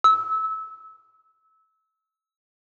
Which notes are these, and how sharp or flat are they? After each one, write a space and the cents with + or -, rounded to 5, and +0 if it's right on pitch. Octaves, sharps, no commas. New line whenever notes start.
E6 -25